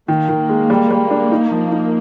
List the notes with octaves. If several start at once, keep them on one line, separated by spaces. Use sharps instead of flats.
D#3 A#3
D#3
G#3
G3
G3
D4
D#4
F3
D#4